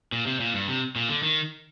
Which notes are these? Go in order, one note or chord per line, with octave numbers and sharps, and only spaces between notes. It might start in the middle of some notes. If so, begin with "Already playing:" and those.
A#2
C3
A#2
G2
C3
A#2
D3
D#3